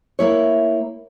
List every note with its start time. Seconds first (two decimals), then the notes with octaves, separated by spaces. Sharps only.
0.19 A#3 E4 C#5